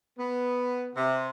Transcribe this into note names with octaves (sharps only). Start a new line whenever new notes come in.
B3
C3